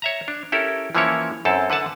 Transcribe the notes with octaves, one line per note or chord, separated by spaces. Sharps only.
C#5 E5 A#5
D4
C#4 E4 G4 A4 A#4
E3 F3 A#3 C#4 E4 C#5
F#2 C4 E4 A4 A5
D3 B4 F#5 A5